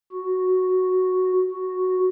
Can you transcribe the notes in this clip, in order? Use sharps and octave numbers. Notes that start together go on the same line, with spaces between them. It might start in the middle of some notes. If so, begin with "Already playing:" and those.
F#4
F#4